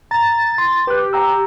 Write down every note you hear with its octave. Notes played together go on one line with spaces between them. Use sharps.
A#5 A6
C6
G4 B4 F#6
G5 A#5 E6